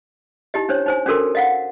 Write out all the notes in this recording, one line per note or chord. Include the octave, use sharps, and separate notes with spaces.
D#4 E4 G4 D#5
C#4 D4 C5 C#5
D#4 C5 G#5
C#4 D4 F#4 A4 A#4 C6
D#5 F5 F#5